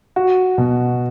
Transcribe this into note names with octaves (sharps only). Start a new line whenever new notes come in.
F#4
B2